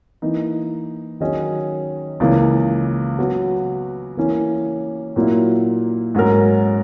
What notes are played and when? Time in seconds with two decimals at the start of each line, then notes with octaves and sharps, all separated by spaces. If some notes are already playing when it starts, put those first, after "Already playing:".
0.22 E3 A#3 D#4
1.20 D#3 F#3 C#4 G#4 D#5
2.20 C#2 C#3 E3 A#3
3.18 F#3 B3 F#4 B4
4.17 E3 A#3 C#4 E4
5.16 A#2 F#3 A#3 E4
6.15 G#2 F#3 C#4 F#4 A#4